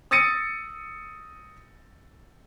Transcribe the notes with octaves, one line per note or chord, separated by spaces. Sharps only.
D#6 E6 A6 A#6 C#7 D#7